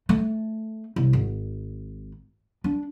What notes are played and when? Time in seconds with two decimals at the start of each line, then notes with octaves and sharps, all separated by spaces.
0.09 A3
0.96 C2
1.13 G#1
2.64 D4